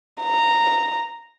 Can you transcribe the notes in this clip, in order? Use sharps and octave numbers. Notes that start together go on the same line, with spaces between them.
A#5